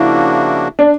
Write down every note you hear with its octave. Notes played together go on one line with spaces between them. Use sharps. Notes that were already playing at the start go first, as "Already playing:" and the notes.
Already playing: C#3 F3 A#3 D4 E4 F#4
D4